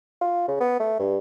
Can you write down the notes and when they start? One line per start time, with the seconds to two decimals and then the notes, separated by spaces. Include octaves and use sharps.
0.21 F4
0.48 C#3
0.60 B3
0.80 A3
0.99 G2